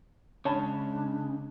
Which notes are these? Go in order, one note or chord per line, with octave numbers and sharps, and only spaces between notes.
C#3 G#3 D4 C#5 A5 B5